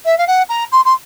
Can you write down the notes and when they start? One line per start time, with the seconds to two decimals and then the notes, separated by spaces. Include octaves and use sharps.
0.05 E5
0.18 F5
0.27 F#5
0.49 A#5
0.72 C6
0.85 C6